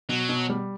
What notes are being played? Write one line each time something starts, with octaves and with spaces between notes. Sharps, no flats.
B2 F#3
B2
G3